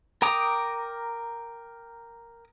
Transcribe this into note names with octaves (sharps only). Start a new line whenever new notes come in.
A#4 G5 A#5 D6 D#6